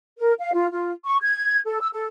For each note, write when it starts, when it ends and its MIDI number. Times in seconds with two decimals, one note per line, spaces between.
0.18 0.32 70
0.39 0.50 77
0.53 0.66 65
0.71 0.91 65
1.04 1.16 85
1.21 1.59 92
1.65 1.80 69
1.80 1.88 88
1.92 2.07 69